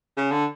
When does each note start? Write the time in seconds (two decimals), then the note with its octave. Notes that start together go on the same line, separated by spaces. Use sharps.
0.17 C#3
0.31 D3